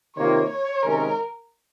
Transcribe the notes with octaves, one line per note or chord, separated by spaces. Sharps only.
C3 D#3 A#3 F4 C#5
C#5
C3 D#3 G#3 C#4 A#4